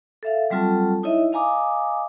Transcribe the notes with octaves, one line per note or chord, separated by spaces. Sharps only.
A4 E5 F5
F#3 G3 C4 F4 A4 A5
D#4 E4 C#5 D#5 E5
D#5 F5 G#5 A#5 D6 D#6